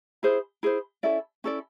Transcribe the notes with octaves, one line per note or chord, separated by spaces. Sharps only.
E4 G#4 C5
E4 G#4 C5
C#4 E4 A4 D5
C#4 E4 A4 D5